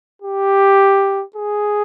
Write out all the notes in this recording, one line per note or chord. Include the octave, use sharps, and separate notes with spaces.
G4
G#4